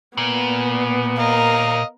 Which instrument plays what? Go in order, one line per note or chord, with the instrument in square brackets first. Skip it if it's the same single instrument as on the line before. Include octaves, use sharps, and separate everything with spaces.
[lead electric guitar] A#2 [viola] B3
[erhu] A#4 [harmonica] D#5 F5